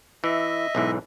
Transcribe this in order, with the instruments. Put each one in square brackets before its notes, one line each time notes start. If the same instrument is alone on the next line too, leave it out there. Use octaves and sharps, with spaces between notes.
[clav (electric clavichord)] E3 [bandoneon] D#5 E5
[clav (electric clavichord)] B1 G#2 E3